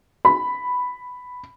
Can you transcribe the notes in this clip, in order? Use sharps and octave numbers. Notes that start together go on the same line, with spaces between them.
B5